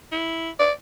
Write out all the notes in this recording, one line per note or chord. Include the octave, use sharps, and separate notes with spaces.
E4
D5